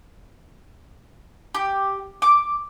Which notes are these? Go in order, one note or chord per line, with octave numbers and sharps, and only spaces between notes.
G4
D6